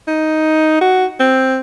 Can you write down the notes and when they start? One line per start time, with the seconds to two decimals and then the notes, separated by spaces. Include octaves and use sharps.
0.08 D#4
0.81 F#4
1.19 C4